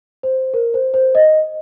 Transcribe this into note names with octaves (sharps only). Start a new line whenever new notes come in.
C5
A#4
C5
C5
D#5